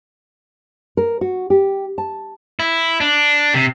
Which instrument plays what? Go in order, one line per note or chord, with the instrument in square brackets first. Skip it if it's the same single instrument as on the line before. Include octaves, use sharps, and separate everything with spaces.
[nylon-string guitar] A#4
F#4
G4
A5
[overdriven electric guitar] E4
D4
C3